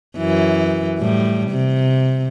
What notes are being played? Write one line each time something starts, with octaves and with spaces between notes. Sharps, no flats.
F#2 E3
A2 G3
C3